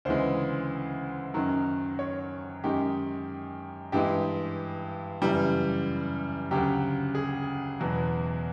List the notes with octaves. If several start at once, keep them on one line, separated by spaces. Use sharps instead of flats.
D2 C#3 E3 G#3 C5
F#2 D#3 F#3
C#5
F#2 D#3 G#3 G4
G2 E3 G#3 G4
F#2 C#3 E3 G3
D2 C#3 F#3 G4
G#4
E2 B2 F#3